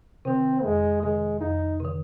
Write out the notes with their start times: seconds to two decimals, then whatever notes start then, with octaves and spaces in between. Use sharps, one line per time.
0.25 C3 D#3 C4
0.64 F2 G#3
1.03 C3 D#3 G#3
1.41 F2 D#4
1.80 C3 D#3